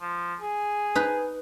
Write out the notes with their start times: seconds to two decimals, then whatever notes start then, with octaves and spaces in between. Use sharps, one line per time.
0.01 F3
0.41 G#4
0.95 D#4 B4